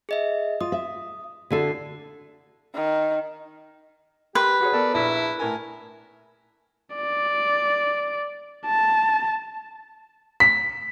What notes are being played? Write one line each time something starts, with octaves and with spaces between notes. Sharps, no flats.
G#4 D#5 E5
F4 D#6
E5
D3 E4 F#4 A4 D5 C7
D#3
G4 A#4 B4 C6
F#4 G#4 C#5
B3 A4 A#4 D5
A#1 E4
A2 A#4 G#5
D5
A5
B6